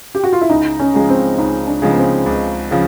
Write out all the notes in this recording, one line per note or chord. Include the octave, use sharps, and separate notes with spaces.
G4
F#4
F4
E4
C#2 D#4
C#4
C#3 F3 G#3
C4
C#2 D#4
D4
C#3 F3 G#3
B3
C4
C#2
C#3 F3